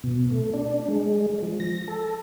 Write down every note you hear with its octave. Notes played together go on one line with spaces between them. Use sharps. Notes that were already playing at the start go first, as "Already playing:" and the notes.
B2
A3
D4
G#3
F3
A#6
A4